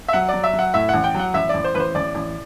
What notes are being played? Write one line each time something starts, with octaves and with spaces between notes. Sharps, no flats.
E5
F#3 F#5
D5
F#3
E5
F#3
F#5
A2 E5
A1 F#5
G5
F#3 F#5
A1 E5
A1 D5
C5
A1 B4
C5
A1 D5
A1